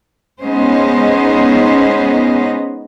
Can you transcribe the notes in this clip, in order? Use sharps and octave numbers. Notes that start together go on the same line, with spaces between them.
G#3 B3 C#4 D#4 C5 D#5